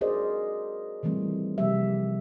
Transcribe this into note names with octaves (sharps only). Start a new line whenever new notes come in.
F#4 G#4 A#4 C5 D5 D#5
D#3 E3 G3 A3 C4
C3 F3 G3 A#3 G4 E5